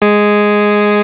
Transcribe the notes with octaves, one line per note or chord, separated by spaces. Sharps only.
G#3 G#4